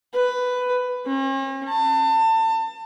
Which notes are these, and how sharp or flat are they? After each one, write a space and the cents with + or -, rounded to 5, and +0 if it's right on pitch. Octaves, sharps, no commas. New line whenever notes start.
B4 +10
C#4 -45
A5 +30